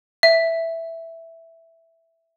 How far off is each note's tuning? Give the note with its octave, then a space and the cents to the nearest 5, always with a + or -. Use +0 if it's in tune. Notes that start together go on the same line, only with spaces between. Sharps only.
E5 +0